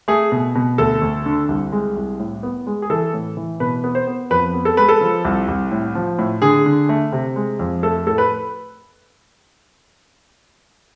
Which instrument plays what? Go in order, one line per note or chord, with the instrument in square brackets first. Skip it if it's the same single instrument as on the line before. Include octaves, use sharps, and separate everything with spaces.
[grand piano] A3 G#4
B2
B2
D2 A4
D2
D3
C2
G#3
C2
A2
B3
G#3
G#4
E3 A4
A2
E3
B2 B4
B3
C5
B3
F2 B4
B3
A4
G#3 B4
A4
F3
C2
C2
A2
F3
A2
D3 G#4
D3
A3
C3
G#3
F2
A3 A4
A2 A4
B4